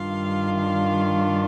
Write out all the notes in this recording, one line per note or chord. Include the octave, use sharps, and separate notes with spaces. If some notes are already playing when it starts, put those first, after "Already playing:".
Already playing: G2 D#3 G3 D4 F4 F5
F5